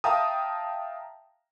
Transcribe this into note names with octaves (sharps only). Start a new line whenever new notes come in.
E5 F5 G5 A5 A#5 D#6